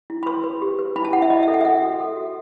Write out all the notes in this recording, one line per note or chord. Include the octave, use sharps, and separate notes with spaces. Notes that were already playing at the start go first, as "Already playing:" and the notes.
E4
B5
B4 C6
B4
G4
B4
E4 B5
A5
E4 F#5
E5
E4 D#5
E5
A4
F#5
E5
A4 F#5
F#4
A4
F#4